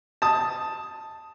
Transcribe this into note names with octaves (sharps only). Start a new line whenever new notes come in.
A5 D#6